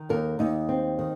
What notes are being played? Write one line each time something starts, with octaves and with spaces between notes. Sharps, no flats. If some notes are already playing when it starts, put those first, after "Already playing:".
Already playing: D#3
D#2 A#4
D#2 D#4
C4
D#3